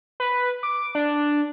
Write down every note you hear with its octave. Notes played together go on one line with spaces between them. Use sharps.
B4
D6
D4